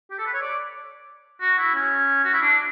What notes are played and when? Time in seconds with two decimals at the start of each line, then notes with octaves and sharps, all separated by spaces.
0.11 G4
0.18 A4
0.26 B4
0.34 C#5
0.41 D5
1.41 F#4
1.58 E4
1.75 C#4
2.24 F#4
2.33 E4
2.42 D4